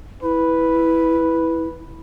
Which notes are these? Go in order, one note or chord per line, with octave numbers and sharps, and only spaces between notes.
E4 B4